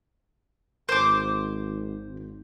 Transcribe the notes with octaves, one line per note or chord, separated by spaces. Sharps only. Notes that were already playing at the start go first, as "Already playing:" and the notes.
G#1 C5 D6
G#1